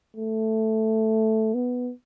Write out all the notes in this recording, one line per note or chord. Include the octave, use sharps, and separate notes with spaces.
A3
B3